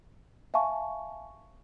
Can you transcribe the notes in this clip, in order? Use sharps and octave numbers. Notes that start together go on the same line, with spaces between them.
E5 F5 G#5 A5 C#6